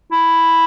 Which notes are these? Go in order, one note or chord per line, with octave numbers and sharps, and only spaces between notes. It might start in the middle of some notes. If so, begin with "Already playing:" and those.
E4